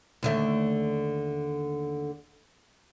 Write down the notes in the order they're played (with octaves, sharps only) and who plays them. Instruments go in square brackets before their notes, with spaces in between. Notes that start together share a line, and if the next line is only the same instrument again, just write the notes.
[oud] D#2 D3 A3